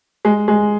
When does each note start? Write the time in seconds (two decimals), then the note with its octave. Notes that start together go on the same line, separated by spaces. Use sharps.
0.25 G#3
0.48 G#3